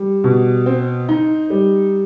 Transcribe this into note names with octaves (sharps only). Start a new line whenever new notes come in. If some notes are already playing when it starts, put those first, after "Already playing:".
Already playing: G3
B2
C4
D#4
G3